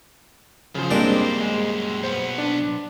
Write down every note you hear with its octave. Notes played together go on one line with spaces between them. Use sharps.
F#2 C#3 F3 C5
G3 G#3 A#3 C4 D4
G#3
B1 B3 C5
D4